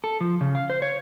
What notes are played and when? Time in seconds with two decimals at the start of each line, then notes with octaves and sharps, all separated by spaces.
0.04 A4
0.21 F3
0.41 C#3
0.55 F5
0.70 C5
0.82 C#5